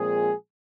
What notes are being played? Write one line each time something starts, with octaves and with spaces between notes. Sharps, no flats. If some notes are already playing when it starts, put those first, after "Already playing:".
Already playing: A#2 F3 G#3 C4 G#4